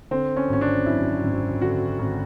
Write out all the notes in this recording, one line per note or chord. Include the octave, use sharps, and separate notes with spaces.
D3 C4
C#4
G#1 C#4
D4
F#2 E4
G#1
D3 F#4
G#1